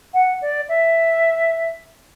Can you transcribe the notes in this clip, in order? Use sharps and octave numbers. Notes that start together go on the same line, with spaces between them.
F#5
D5
E5